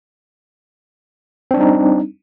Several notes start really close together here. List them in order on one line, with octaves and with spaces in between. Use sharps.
C4 D4 G3 D#4